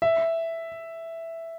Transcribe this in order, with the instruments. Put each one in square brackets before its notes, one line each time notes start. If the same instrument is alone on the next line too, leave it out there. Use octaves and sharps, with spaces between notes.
[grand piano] E5